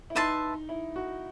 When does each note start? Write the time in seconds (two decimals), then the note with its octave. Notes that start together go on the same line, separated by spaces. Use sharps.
0.10 E4
0.15 D#4 B4 E5 A5 C6
0.69 E4
0.96 F#4